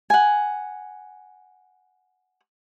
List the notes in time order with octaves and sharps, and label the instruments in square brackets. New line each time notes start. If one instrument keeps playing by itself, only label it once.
[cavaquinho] F#5 G#5